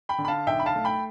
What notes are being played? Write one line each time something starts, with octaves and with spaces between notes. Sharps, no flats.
G5 B5
D3
B5
F5 A5
B1 E5 G5
B5
F5 A5
A3
G5 B5